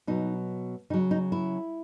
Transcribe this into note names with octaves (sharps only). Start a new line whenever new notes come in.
B2 F#3 D#4
C#3 F#3 D#4
D#4
E4